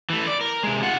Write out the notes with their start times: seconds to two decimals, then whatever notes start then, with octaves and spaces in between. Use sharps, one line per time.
0.10 E3 A3
0.27 D5
0.41 A#4
0.63 C3 G#3
0.83 F4 F#5